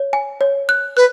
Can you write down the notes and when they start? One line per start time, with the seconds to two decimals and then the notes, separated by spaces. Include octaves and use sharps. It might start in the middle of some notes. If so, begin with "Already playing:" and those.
Already playing: C#5
0.13 G#5
0.41 C#5
0.69 F#6
0.97 B4 F#6